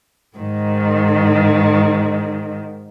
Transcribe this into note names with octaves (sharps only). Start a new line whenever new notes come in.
G#2 D#3